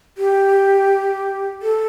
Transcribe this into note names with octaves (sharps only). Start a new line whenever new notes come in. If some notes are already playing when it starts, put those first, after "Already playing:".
G4
A4